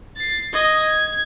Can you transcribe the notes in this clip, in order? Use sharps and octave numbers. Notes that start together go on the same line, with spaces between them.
A6 C7
D#5 G#6
G#6